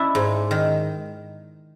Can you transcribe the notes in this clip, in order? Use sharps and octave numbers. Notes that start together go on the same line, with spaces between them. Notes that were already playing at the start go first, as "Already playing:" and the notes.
Already playing: D4 E4
G#2
D#3